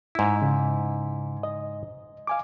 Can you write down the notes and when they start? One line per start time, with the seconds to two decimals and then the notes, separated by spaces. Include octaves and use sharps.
0.15 G#2 E4
0.42 C#3
1.43 D#5
2.27 F5 G#5 D6